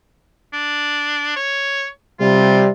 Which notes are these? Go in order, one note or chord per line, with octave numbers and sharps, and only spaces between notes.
D4
C#5
C3 G3 F4